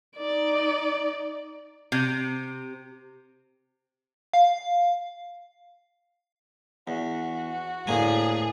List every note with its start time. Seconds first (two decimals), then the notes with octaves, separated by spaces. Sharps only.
0.17 D#4 D5
1.92 C3
4.34 F5
6.88 E2 F#4
7.87 D2 A2 A#3 G#4 G#5